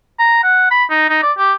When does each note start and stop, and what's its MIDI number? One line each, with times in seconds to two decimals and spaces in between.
0.19 0.39 82
0.43 0.68 78
0.71 0.84 83
0.90 1.09 63
1.10 1.19 63
1.23 1.32 74
1.38 1.53 67